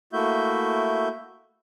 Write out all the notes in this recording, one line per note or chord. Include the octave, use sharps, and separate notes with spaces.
A3 A#3 E4 F#4 E5 G6